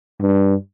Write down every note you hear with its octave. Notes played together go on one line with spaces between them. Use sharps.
G2